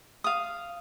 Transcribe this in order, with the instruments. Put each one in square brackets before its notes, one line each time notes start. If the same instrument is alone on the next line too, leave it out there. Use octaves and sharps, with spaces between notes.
[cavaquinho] F5 D#6